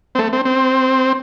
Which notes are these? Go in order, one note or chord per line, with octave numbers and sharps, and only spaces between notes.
C4
A3
C4
C4